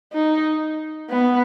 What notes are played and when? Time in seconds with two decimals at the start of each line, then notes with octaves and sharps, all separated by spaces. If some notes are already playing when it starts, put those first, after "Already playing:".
0.13 D#4
1.10 B3